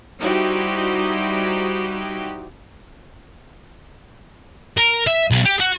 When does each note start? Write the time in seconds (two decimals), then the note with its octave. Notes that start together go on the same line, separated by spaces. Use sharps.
0.20 G3 D#4 E4 F#4 G4 C5
4.77 A#4
5.07 E5
5.31 B1
5.45 G4
5.60 F#4